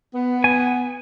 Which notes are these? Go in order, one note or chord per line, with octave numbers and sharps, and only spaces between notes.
B3
G#5